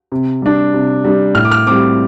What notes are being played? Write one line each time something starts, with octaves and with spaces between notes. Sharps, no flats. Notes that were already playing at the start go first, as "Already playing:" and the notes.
C3
G3 D4
C3
G3 D4
A2 F6
D6
F6
G3 C4 D6